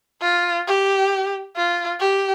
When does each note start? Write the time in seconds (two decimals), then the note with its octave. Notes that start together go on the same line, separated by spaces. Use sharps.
0.21 F4
0.67 G4
1.56 F4
2.00 G4